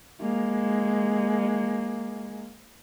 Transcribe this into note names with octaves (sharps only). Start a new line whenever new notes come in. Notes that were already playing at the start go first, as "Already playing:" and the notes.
G#3 A#3